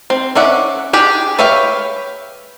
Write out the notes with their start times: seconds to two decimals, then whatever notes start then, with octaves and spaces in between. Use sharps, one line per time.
0.10 C4
0.35 C#4 D5 E5 F#5
0.93 D4 G4 G#4
1.39 B4 C#5 E5 F5 G5